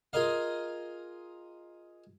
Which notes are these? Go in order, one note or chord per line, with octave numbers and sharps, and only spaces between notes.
F4 G#4 A#4 D#5 F5